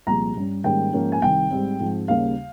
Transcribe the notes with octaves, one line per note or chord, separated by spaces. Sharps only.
C2 A#2 F3 G#3 A#5
G2 G3 C#4
G#2 D#3 G3 A#3 C#4 G5
G#2 F3 A#3 C#4
G#5
C2 C3 D#3 G5
G#2 G3 C4
G#2 F3 C4
D#2 C#3 G3 A#3 F5